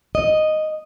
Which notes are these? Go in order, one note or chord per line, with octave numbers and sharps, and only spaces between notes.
D#5